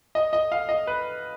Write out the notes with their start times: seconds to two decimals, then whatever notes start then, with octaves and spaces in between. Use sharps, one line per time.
0.15 D#5
0.33 D#5
0.52 F5
0.69 D#5
0.87 B4